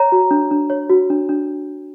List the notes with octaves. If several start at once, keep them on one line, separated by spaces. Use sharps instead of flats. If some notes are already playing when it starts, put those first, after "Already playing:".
Already playing: C#5 A#5
F#4
D4
D4
C#5
F#4
D4
D4